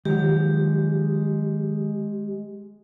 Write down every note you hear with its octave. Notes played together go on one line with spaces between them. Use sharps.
D#3 F3 F#3 G#3 G4